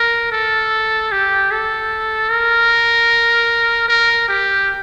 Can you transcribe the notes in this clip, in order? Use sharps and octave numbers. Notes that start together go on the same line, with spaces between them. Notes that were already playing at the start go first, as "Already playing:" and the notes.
Already playing: A#4
A4
G4
A4
A#4
A#4
G4